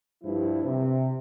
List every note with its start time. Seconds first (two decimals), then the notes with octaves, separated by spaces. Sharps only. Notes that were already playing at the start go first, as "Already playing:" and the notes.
0.23 G2 F3 E4
0.63 C3